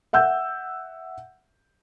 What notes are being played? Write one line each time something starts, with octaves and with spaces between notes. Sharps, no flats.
E5 F#5 E6 G6